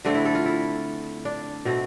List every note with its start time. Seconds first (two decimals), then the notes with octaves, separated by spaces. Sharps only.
0.05 D3 A3 C4 D4
0.15 E4
0.25 A4
0.35 F4
0.46 E4
1.25 D4
1.65 B2 A3 C4